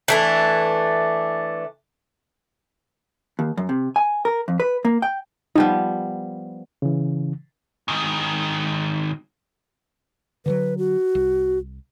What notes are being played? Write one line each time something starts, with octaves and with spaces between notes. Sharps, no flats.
E3 A3 D4
D#2
F#2
C3
G#5
A#4
F2
B4
A#3
G5
F3 G3 B3 D#4
C#3 E3
G#2 D#3
D3 D#3 F#3 B4
F#4
C2